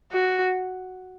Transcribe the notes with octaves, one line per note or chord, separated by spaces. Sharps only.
F#4